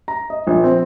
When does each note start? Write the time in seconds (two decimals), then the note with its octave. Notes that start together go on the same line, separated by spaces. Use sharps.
0.08 A#5
0.30 D#5
0.47 A#1
0.64 C4